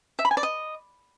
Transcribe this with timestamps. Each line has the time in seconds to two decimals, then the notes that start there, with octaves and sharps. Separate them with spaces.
0.19 E5
0.25 B5
0.31 G#5
0.37 D5
0.43 D#5